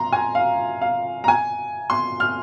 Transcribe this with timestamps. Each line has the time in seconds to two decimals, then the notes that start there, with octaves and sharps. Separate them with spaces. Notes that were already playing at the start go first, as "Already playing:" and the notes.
Already playing: A#5 C6
0.13 G#5
0.35 F5
0.81 F5
1.24 A#5
1.28 G#5
1.90 C6
2.20 F6